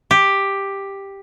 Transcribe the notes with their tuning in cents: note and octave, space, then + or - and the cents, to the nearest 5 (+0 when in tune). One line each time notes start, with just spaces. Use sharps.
G4 +5